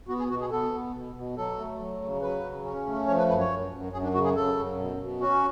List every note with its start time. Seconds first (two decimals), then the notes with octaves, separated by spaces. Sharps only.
0.08 B3 F#4
0.19 G#4
0.30 B2 F#4
0.41 G#4
0.51 B3 A4
0.72 B3
0.94 B2
1.15 B2
1.36 F#3 A4
1.58 A3
1.79 F#3
2.01 C#3
2.22 F#3 B4
2.43 C#3
2.65 C#4
2.86 A3
3.07 F3 C#5
3.18 B4
3.29 F#2 B4
3.39 C#5
3.50 F#2
3.72 F#2
3.92 F#2 G#4
4.03 D4
4.14 C#3 F#4
4.24 G#4
4.35 C#3 A4
4.57 F#2
4.78 B2
4.99 B2
5.20 C#4 F#4